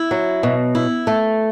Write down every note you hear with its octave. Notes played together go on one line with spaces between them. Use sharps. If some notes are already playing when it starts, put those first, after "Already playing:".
Already playing: E4
F#3
B2
E4
A3